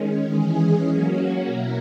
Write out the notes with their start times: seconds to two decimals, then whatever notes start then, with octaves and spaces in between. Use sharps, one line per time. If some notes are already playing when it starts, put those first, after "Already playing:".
Already playing: D#3 G#3 C#4
0.24 E3 G#3 C#4 G#4
0.84 F#3 A#3 C#4 F#4
1.44 B2 A#3 E4 A#4